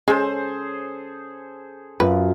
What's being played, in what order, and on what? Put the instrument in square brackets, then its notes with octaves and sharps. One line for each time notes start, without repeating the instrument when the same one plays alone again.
[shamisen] G#3 [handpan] C#4 [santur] G#4 A4 C5
[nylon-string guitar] F#2 [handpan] F4 F#4 [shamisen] B4